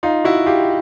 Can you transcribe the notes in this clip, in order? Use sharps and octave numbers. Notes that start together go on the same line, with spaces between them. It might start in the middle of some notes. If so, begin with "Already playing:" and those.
D#4 F4
E4 F#4
F4 G4